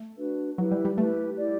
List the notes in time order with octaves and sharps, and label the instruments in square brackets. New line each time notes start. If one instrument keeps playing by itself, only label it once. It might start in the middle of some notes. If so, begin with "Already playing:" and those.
Already playing: [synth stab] A3
[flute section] D4 F#4 B4
[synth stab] F#3 [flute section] E4 G4 B4
[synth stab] G3
G3
[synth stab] A3 [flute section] E4 G4 B4
[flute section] E4 G4 D5